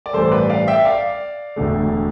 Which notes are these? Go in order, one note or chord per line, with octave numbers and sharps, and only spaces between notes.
D5
A1 G2 E3 A4 C5
C5
B4 D5
D5 F5
E5 G5
D5 F5
E1 D2 D3 A3